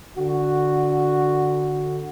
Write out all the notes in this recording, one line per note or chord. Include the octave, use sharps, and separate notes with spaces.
D3 F#4